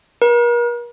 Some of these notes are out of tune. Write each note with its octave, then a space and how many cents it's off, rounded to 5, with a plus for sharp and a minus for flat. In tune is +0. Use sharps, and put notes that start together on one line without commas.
A#4 +40